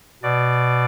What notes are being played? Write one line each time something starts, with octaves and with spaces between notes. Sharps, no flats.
B2 D5